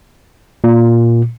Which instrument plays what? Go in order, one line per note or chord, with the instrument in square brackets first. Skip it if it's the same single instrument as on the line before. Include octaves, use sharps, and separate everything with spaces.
[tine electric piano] A#2